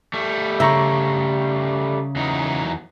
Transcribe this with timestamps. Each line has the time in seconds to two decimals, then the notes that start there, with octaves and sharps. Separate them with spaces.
0.13 G3 A3
0.60 C#3 E5 A#5 C#6
2.16 E2 F#3 D#4